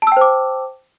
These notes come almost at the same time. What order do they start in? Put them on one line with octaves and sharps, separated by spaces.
A5 E6 G5 C5 D6